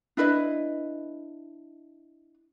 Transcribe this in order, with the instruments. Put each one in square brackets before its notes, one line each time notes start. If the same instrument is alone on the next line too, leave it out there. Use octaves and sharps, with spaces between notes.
[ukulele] D4 E4 B4 D#5